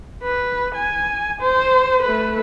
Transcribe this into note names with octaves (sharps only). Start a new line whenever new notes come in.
B4
G#5
C5
A3 B4